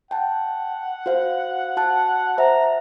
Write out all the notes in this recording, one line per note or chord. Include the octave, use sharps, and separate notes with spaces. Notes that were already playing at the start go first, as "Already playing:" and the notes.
F#5 G5 A5
F#4 C5 F5
F#4 A5 F#6
C5 E5 A#5